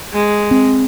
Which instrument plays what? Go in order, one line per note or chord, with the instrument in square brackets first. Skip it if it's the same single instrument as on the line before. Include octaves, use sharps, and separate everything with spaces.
[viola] G#3
[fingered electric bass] C4